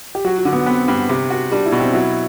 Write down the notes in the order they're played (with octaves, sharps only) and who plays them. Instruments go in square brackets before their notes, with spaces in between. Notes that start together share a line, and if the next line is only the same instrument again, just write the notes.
[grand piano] G4
[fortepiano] F#3 [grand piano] F#4
[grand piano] F#4
[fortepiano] D3
[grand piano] B3
[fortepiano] B3 [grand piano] C4
[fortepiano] G2
C3
F#4
[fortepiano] G3 [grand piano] D4
[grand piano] E4
[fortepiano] B2
[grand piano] C4
[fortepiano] F#3 [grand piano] E4